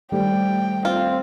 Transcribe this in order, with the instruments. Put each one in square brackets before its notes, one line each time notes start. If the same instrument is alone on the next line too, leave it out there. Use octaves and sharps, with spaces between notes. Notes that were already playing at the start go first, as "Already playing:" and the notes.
[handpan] D#3 A3 C5 [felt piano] G3 [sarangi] G5
[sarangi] C4 [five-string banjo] F4